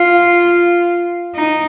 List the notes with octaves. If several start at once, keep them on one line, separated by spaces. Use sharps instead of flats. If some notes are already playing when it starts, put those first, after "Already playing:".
Already playing: F4
D#4